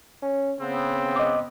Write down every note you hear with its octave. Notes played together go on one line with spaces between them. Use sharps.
C#4
C#3 B3 C4
D#5 D6